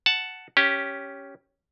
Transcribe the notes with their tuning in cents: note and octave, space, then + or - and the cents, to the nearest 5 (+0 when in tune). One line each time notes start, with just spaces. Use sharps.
F#5 +0 A5 +0
C#4 +0 G4 +0